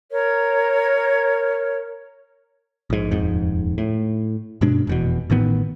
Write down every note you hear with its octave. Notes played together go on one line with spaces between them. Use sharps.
A#4 C#5
A#1 G#2
D#1 F2 G#2
A2
G2 B2 G#3 D4
F1 E2 B2
A1 A2 D#3 B3